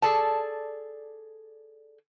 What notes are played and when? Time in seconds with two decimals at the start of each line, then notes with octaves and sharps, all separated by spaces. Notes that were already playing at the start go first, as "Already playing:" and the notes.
0.02 G#4 A4 D5 A5